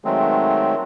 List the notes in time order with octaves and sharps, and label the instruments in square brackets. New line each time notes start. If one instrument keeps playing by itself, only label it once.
[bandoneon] D#3 F#3 G#3 A3 C4